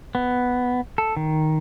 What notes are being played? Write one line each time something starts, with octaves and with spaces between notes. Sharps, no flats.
B3
A4
D#3